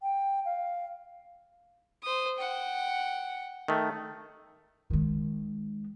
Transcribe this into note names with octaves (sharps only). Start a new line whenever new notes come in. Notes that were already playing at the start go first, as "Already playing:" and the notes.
G5
F5
C5 D#6
F#5 G5
D#3 A3
D#3 G#3